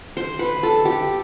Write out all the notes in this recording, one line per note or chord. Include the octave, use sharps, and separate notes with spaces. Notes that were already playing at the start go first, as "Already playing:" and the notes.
C5
B4
A4
G4